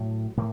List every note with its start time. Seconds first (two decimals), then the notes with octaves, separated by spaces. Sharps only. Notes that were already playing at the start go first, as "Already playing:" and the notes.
Already playing: A2 F#3
0.37 A2 A#3